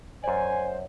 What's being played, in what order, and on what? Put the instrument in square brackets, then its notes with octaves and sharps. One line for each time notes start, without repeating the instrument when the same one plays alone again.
[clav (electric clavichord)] F#2 D5 [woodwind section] C5 [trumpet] G#5